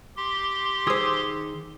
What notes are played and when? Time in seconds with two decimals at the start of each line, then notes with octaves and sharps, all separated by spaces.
0.17 G4 C6
0.87 D#3 G#4 C5 D#6 E6